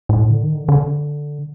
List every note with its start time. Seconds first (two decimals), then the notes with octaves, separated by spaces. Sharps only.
0.09 A2
0.30 D3
0.42 D#3
0.55 D3
0.69 D3